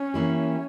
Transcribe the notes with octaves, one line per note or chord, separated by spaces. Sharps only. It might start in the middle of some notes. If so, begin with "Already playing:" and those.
Already playing: C#4
E3 A#3 E4 G4